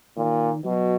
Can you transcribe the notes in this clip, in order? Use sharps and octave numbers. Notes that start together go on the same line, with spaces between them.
A#2 D#3
B2 F#3